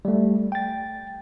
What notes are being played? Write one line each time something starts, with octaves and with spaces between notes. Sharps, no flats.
G3 A3
G5 A6